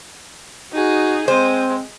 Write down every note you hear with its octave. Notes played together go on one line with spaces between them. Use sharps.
D#4 F#4 G#4
G#3 C4 C5